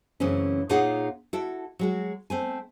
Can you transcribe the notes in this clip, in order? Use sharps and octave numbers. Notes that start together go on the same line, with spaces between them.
F#2 C#3 E3 A3 C4 C#4
A#2 D#4 F4 G#4 C#5 F#5
E4 F#4 A4
F#3 G#3 F#4
A3 C4 G#5